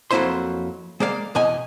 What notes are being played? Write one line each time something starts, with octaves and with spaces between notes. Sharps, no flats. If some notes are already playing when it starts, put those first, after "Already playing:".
F2 F#3 A#3 E4 C5 C6
G#3 A#3 D5 F5
E2 B2 D#5 G#5